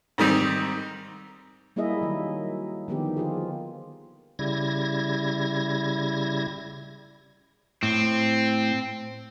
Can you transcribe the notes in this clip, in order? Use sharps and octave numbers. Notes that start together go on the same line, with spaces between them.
G#2 D#3 G3 C4
G3 A#3 E4 G#4 D#5 E5
D#3 F#3
D3 D#3 F3 B3 G4
F3 F4 G#4
C#3 G3 E4 G#6 A#6
A2 C4